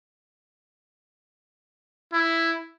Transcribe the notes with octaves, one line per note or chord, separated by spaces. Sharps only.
E4